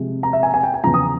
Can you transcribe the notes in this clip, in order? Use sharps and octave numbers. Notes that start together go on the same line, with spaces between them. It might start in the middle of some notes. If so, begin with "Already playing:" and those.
Already playing: C3 F3 G#3
A#5
E5
G#5
G#5
G5
G#5
E2 C#3 F3 A#5
D#6